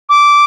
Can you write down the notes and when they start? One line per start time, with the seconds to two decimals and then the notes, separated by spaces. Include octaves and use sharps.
0.09 D6